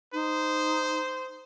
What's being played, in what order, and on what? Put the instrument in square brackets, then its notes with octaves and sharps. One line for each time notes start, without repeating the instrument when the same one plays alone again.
[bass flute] D#4 [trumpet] C5